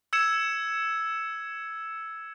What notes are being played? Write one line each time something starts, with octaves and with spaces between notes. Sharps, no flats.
E6 G#6 C#7 E7